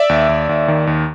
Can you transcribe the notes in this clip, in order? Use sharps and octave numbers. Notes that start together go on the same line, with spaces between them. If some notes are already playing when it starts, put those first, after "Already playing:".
Already playing: D5 E5
D#2
D#2
D#2
D#3
D#2